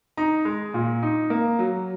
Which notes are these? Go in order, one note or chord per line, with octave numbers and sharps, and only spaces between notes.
D#4 A#5
G#3
A#2
D#4
A#3
F#3